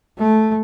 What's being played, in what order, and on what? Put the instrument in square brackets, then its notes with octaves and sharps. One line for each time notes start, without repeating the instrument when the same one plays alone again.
[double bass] A3